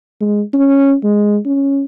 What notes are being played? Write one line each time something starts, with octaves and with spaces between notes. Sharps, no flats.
G#3
C#4
G#3
C#4